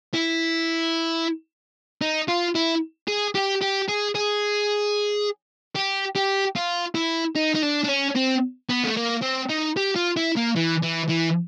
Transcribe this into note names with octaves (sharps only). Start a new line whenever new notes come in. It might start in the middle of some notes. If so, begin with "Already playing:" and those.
E4
D#4
F4
E4
G#4
G4
G4
G#4
G#4
G4
G4
F4
E4
D#4
D#4
D4
D4
C#4
C4
B3
A3
A#3
C4
D#4
G4
F4
E4
A#3
E3
E3
E3